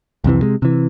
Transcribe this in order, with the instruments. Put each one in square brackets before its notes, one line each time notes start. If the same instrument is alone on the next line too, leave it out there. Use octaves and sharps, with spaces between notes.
[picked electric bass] C2 F2 C3 E3
C3 G#3
C3 E3